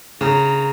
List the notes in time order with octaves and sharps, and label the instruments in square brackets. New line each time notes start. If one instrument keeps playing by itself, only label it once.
[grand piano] C#3 [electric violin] A#5